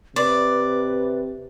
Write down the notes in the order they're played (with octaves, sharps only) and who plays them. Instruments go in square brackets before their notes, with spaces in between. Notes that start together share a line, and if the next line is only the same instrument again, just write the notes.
[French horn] C3 [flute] B4 [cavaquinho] D5